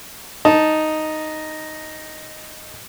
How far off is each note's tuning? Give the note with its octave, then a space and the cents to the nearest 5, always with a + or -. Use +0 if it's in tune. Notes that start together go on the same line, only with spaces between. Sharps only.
D#4 +0 A5 +0